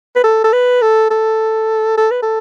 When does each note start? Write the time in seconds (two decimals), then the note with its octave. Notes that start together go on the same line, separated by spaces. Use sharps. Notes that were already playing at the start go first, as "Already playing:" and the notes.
0.16 B4
0.24 A4
0.44 A4
0.53 B4
0.82 A4
1.10 A4
1.97 A4
2.11 B4
2.22 A4